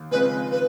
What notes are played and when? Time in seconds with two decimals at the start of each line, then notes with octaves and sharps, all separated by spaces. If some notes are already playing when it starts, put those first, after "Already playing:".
Already playing: D#2
0.11 C#3 F3 G#3 C4 B4
0.52 B4